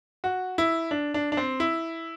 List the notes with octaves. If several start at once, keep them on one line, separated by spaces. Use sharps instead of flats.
F#4
E4
D4
D4
D4
C4
E4